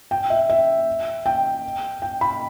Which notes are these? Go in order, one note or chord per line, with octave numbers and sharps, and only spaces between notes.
G5
E5
E5
G5
G5
B5